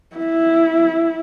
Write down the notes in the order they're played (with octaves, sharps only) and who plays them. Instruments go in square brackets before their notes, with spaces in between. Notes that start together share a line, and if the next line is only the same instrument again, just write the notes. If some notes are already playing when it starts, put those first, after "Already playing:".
[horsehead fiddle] E4